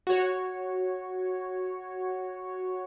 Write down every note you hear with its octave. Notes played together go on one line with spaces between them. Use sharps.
F#4 C#5